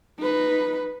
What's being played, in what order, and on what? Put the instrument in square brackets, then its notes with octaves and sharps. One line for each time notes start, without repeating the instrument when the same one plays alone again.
[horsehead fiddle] D#4 B4